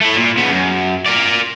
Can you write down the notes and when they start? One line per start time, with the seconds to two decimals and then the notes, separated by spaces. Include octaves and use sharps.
0.01 A3 E4
0.15 A#2
0.37 C#3 B3
0.51 F#2
1.06 A#4 D5